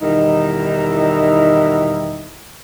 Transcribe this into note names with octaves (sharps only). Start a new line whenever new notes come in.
E2 B2 D#3 G3 D#4 E4